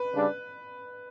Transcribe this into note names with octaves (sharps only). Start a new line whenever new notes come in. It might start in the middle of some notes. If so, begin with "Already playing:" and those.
Already playing: B4
C#3 G3 D4